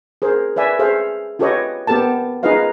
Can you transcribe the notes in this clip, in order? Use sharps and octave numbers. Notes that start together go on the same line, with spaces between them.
G#4 A#4 C5
B4 D5 E5 G#5
G#4 A4 C5 E5 F5
F4 G4 A4 B4 C#5 D#5
B3 G4 A4 A#4 A5
D#4 F4 G#4 B4 D#5 F5